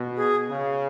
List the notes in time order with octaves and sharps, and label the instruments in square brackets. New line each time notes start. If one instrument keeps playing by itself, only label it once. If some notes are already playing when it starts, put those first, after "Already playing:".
Already playing: [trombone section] B2
[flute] G#4
[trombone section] C#3